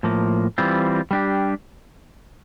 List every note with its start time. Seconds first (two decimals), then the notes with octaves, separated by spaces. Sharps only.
0.03 A2 F3 A#3
0.58 E3 G3 C4 F4
1.11 G3 D4 G4